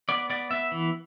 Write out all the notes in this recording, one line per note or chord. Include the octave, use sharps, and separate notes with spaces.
B3 D5
B3 D5
B3 E5
E3